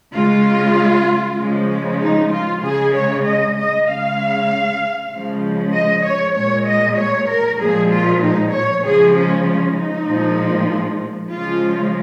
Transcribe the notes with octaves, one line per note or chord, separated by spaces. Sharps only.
C#3 G#3 F4
C#3 F3 G#3
D#4
F4
C#3 G#3 G#4
C#5
D#5
D#5
C#3 G#3 F5
C#3 F3 G#3
D#5
C#5
A#2 G#3 C#5
D#5
C#5
A#4
A#2 F3 G#3 G#4
F4
D#4
C#5
C#3 F3 G#3 G#4
C#4
C#4
D#4
A#2 F3 G#3
C#3 F3 G#3 F4